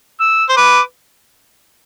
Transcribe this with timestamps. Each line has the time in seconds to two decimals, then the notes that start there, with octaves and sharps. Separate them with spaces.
0.20 E6
0.49 C5
0.57 B4 D6